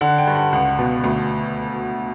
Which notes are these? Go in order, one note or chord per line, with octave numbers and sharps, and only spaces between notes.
D3 F#5
G5
G2
F#5
C#2 F#5
B2
D2